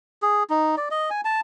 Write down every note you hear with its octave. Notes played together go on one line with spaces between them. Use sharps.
G#4
D#4
D5
D#5
G#5
A5